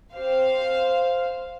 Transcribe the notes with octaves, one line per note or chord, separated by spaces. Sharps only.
C4 G4 C5 F5